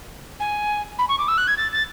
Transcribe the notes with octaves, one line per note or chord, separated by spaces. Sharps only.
G#5
B5
C#6
D6
E6
F#6
G#6
A6
A6